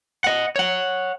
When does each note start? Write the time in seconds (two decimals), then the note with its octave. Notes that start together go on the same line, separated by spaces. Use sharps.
0.24 D#5 F#5
0.56 C#5 F#5